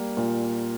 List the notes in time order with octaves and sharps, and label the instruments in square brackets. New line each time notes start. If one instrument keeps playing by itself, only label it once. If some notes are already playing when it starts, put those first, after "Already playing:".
Already playing: [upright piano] G3 A#3
A#2